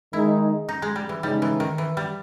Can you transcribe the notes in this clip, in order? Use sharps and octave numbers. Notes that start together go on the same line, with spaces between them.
D#3 G#3 D#4 E4
D#4
G#3
G3
E3
C#3 G3 G#3 D#4
E3
D#3
E3
G3